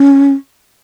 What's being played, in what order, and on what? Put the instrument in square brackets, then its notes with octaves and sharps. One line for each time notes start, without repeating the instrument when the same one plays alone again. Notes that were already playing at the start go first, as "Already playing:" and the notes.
Already playing: [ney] C#4